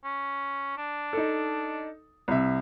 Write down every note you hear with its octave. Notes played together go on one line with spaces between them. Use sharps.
C#4
D4
D#4 A4
C2 C3 E5